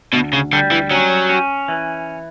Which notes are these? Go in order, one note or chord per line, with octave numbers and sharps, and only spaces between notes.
D2 B2
C#3
D3 G3
E3
F#3 C#4
C#4
E3